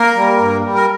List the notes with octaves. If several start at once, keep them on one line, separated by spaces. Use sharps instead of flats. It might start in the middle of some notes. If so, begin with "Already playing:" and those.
Already playing: A#3 A#4
G3
G2
G3
A#4